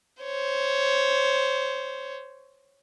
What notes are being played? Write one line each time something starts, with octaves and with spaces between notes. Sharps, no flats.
C5 C#5